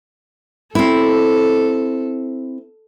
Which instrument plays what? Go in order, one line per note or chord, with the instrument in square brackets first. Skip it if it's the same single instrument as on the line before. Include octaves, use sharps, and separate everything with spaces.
[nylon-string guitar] C4 E4 [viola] A4